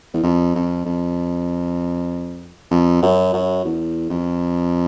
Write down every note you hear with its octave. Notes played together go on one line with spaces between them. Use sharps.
E2
F2
F2
F2
F2
F#2
F#2
E2
F2